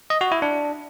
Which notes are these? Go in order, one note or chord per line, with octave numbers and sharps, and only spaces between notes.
D#5
F#4
E4
D4